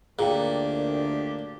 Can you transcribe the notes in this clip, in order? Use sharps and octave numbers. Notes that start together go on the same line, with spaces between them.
D2 A#2 D#3 D4 G4 G#4 G5